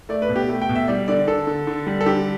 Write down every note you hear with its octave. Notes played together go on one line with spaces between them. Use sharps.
A3 D5
B4
B2
G4
A3
G5
B2
E5
G3 D5
D3 D5
D3 A4
D3
D3
G3
A4
D3 G4